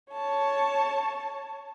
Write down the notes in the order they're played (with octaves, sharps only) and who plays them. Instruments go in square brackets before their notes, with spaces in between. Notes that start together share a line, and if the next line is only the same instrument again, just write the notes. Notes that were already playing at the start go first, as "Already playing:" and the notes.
[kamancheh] C#5 A5